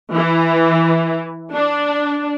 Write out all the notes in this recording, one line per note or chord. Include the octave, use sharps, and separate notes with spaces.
E3
D4